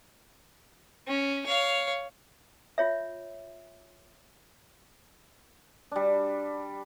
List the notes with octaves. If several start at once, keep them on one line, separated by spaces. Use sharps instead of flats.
C#4
C#5 F5
F4 C#5 E5
G3 D4